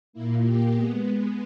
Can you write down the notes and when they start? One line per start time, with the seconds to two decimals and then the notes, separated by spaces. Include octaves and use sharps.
0.13 A#2 A#3 E4
0.44 G4
0.74 G#3 B3 G#4